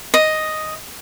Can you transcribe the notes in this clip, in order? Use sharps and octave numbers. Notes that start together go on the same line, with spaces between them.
D#5